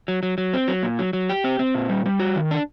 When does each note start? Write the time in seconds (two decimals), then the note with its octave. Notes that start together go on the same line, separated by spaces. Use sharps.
0.08 F#3
0.23 F#3
0.38 F#3
0.54 C4
0.68 F#3
0.83 A#2
0.99 F#3
1.13 F#3
1.29 G4
1.44 C4
1.59 C4
1.75 A#2
1.89 G3
2.05 G3
2.20 F#4
2.36 D#3
2.51 D4